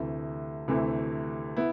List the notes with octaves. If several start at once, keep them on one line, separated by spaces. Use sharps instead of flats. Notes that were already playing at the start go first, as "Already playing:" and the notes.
Already playing: D2 C3 E3 A3
D2 C3 E3 A3
B3 E4